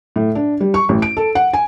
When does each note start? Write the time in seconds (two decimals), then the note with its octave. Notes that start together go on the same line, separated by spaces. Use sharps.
0.16 A2
0.35 D4
0.60 G3
0.74 C#6
0.89 A1
1.02 D7
1.17 A4
1.35 F#5
1.53 G#5